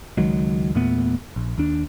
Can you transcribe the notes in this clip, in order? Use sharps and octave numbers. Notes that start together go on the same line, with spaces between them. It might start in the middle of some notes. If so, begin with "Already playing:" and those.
C#2 D#3 F#3 G#3
E2 A#2 A3 B3
A#1
D#2 D4